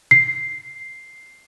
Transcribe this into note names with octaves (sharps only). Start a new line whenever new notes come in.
C7